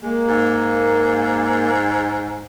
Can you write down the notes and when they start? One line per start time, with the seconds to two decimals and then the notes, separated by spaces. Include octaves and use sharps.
0.02 G#3 A#3
0.28 G#2